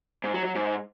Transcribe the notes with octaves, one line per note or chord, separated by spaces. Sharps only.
G#2
F#3
F#3
G#2